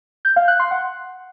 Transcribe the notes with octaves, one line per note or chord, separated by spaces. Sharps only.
G6
F5
F#6
C6
F#5